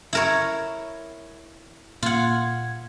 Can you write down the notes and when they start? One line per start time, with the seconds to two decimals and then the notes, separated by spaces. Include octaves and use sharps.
0.13 E4 A#4 C#5
2.03 A#2 F4 F#5 G#6